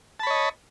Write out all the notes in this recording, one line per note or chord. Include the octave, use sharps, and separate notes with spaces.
C#5 D#5 A5 B5